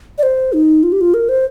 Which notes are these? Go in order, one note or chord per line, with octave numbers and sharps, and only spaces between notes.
D5
C5
D#4
F4
G4
F4
A#4
C5